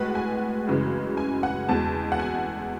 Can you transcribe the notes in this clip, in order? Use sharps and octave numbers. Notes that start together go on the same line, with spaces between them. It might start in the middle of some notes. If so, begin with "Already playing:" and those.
Already playing: A2 G#3 F#4 B4
G#5
F#2 C#3 E3 G#3
G#5
F#5
E2 B2 G#3 A5
F#5
G#5